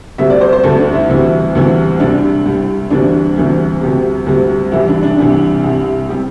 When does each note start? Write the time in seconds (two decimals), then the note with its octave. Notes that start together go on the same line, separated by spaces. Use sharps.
0.18 D2 C3 G3 E5
0.30 D5
0.41 C5
0.53 C5
0.64 D2 C3 G3 A4
0.79 D4
0.94 E4
1.09 D2 C3 E3 G3
1.55 D2 C3 E3 G3
2.00 C2 C3 G3 D4
2.46 C2 C3 G3
2.90 D2 C3 E3 G3 D4
3.36 D2 C3 E3 G3
3.81 D2 C3 G3 G4
4.27 D2 C3 G3
4.72 C2 C3 E3 G3 E4
4.88 D4
5.03 D4
5.18 C2 C3 E3 G3
5.64 C2 C3 G3
6.09 C3 G3 G4